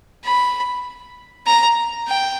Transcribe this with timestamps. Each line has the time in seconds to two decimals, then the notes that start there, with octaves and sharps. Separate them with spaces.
0.24 B5
1.46 A#5
2.07 G5